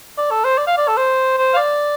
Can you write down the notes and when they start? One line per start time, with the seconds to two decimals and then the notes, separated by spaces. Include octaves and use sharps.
0.18 D5
0.31 A4
0.44 C5
0.58 D5
0.67 F5
0.78 D5
0.88 A4
0.97 C5
1.38 C5
1.54 F5
1.57 D5